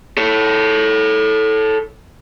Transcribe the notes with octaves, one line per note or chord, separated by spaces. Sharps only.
A4 C#5